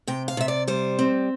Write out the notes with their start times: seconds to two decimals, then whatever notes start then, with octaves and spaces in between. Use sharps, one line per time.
0.07 C3 G5
0.28 F5
0.37 C3 E5
0.48 D5
0.68 G3 C5
0.99 C4